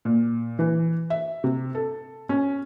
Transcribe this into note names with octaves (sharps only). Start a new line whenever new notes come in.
A#2
E3
E5
C3
A4
C#4